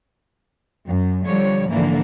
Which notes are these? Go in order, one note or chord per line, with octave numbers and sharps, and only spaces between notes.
F#2
D3 F3 G3 C#5
G#2 D3 E3 F3 A#3